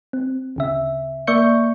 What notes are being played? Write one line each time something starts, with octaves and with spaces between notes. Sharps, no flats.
C4
D2 C#3 E5
A#3 D5 E5 C#6 G6 C#7